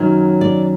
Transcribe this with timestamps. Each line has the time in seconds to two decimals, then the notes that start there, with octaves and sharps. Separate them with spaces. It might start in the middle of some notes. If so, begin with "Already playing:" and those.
Already playing: F#2 D#3 F#3
0.41 D5